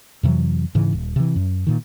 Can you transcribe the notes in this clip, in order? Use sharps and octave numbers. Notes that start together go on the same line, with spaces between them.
F2 C3 E3 F#3
G#2 C#3 E3
D#1
C3 E3
F#2
A#2 D#3